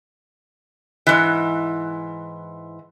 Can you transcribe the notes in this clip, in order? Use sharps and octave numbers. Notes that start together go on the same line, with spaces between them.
G#2 E3